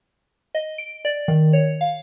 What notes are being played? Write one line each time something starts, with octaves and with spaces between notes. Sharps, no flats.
D#5
D7
D5
D#3
C#5
F5